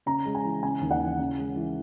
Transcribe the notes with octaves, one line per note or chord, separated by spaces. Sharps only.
C#3 A#5
G#3
G#5
E3
C#3 G#5
D#2
F#5
E3
C#3
G#3
E3